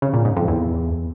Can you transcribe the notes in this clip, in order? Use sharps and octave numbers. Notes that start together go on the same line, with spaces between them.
C#3
A#2
G#2
F2
E2